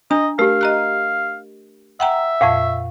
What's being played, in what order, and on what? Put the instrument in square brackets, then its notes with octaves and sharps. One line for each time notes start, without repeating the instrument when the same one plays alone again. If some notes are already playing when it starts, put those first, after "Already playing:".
[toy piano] D4 [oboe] D#5 [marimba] A#5
[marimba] A3 [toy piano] G4 A#4 [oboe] F5
[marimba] D#5 A#5 F#6
[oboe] E5 [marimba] F#5 G5 A#5
[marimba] F2 A#2 [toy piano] F5 F#5 C#6